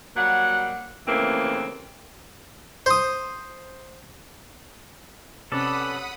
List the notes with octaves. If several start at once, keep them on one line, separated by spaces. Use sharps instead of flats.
F#3 G3 A#3 F#5
D#2 C#3 E3 A3 A#3 C4
C5 D#6
C3 C#4 A4 B4 D5 F#5 B5 D#6